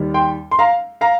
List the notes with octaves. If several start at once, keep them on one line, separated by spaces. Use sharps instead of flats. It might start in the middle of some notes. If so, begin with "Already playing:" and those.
Already playing: D#2 D#3 G3
G5 C6
C6
F5 A#5
F5 A#5